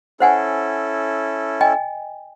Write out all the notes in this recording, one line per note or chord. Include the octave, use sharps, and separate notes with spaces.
C#4 E4 A4 C5 F#5 G#5
D#5 G5 G#5